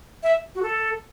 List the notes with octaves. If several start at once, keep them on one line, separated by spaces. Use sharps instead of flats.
E5
F#4
A4